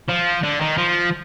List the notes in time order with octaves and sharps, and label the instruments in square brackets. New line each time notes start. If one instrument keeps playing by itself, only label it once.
[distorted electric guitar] F3
D3
D#3
F3